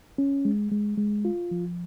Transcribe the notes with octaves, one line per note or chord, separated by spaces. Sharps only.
C#4
G#3
G#3
G#3
F4
F3